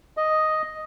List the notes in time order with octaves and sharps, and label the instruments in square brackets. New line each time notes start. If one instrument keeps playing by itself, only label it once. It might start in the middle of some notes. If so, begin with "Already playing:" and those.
[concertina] D#5